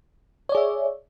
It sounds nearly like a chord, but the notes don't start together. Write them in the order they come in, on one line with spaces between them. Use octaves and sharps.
C#5 D5 G#4 E5